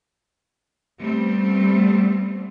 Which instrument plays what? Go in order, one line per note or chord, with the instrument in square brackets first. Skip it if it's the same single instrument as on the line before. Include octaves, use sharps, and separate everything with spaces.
[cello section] G3 A3 B3 C4